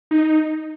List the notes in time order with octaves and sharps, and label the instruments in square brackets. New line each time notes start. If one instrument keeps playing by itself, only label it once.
[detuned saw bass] D#4